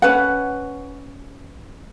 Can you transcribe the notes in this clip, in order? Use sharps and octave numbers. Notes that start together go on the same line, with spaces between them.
C#4 B4 F#5